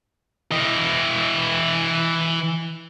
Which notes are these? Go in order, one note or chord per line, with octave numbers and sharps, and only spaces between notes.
E3 D#5